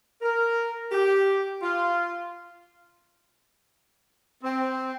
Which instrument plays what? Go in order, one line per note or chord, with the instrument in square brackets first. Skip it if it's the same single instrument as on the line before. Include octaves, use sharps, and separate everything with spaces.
[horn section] A#4
G4
F4
C4